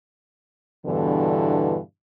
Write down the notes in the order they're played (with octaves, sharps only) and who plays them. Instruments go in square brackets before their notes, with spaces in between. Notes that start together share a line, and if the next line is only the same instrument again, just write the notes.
[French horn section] E2 G2 B2 D3 E3